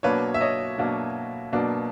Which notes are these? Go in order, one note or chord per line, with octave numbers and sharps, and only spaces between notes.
B2 F#3 A#3 D4 B4 C#5
E5
C#5 D#5
B2 F#3 A#3 D4
B2 F#3 A#3 D4